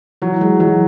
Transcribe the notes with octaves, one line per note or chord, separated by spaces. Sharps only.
E3 F#3
G#3
E3 F#3